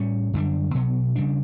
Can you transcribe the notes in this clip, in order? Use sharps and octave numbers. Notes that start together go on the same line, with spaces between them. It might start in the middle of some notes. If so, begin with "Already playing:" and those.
Already playing: A2 G3 C#4
F#2 D3 G3 D4
B2 F#3 B3
C#3 G3 D4